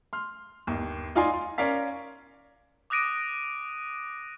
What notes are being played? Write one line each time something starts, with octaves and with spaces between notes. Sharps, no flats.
C6 F6
G1 D#2
D#4 F4 D5 F5 G#5 C6
C6
C#4 A#4 D5 F5 B6
D6 D#6 F#6 A#6 D7 D#7